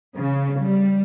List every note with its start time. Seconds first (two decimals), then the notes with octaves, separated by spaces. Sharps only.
0.15 C#3
0.60 G3